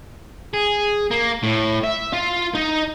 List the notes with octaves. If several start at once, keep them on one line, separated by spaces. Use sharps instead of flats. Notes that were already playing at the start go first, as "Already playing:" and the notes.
G#4
A#3
A2
E5
F4
D#4